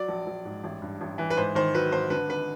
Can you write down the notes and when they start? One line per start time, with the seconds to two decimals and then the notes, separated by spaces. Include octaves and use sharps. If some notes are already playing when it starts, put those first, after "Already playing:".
Already playing: F#3 D5
0.08 A#1
0.26 A#1
0.45 G#2
0.64 A1
0.82 G2
1.01 A1
1.18 E3
1.30 B4
1.37 G#2 C5
1.55 D#3 C5
1.74 F#3 B4
1.92 G#1 C5
2.10 D3 B4
2.29 G#1 B4